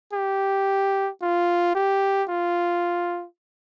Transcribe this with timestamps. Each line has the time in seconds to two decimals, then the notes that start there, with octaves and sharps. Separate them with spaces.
0.13 G4
1.22 F4
1.75 G4
2.29 F4